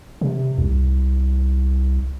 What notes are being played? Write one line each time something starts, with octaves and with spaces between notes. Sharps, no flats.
C3
C2